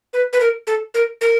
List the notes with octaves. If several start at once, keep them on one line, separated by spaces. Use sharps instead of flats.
B4
B4
A#4
A4
A#4
A#4